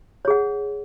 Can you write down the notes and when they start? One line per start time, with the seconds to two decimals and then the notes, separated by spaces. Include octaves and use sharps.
0.25 C#5
0.28 G#4
0.30 F#5